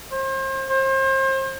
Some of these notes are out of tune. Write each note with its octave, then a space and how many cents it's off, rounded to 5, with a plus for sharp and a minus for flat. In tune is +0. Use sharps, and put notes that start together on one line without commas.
C5 +35
C5 +35